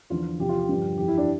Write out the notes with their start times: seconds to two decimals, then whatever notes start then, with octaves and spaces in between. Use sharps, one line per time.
0.10 E2 D3 F3 F4
0.39 E2 C3 F3 G4
0.49 F4
0.59 G4
0.69 G2 D3 F3
0.98 F2 E3 G4
1.08 E4
1.18 D4